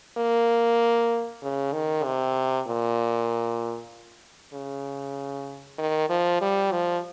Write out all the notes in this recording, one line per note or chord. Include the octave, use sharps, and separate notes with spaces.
A#3
C#3
D#3
C3
A#2
C#3
D#3
F3
G3
F3